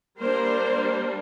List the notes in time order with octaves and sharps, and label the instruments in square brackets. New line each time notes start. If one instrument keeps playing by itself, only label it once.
[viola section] G3 A#3 D4 A#4 C5